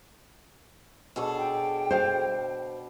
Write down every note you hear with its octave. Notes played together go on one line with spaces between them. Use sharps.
B2 D4 G#4 A4 C#5
G5
C5 F5